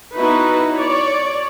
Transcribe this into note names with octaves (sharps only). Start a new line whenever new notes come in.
B3 D#4 E4 F#4 B4
C#5 D5